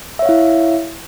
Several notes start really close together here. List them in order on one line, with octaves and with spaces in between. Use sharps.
E5 C#5 F5 E4